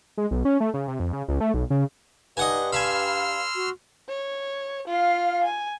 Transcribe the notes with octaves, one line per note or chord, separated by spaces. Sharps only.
G#3
B1
C#4
A3
C#3
C3
F2
C#3
C#2
A3
B1
C#3
G2 D#4 D#5 F#5 G#5
F5 G#5 A5 B5 C6 E6 F6
F#4
C#5
F4 F5 F6
G#5